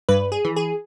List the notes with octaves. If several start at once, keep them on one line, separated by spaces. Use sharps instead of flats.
G2 B4
G#4
E3
G#4